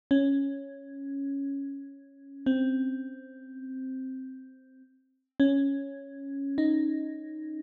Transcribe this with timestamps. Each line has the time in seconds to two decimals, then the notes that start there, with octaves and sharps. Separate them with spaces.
0.11 C#4
2.46 C4
5.40 C#4
6.58 D#4